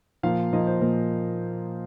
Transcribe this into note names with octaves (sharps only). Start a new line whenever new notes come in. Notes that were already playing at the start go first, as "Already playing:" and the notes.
A#2 F3 A#3 F5
A#2 F3 A#3 D#5
C5
A#2 F3 A#3 A#4